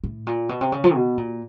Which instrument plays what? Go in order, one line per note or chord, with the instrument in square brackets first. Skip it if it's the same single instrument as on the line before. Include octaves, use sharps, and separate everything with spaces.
[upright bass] A2
A#2
B2
C3
C#3
F3
B2
A#2